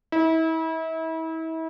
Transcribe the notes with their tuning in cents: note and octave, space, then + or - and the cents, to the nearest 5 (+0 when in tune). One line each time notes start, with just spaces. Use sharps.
E4 -35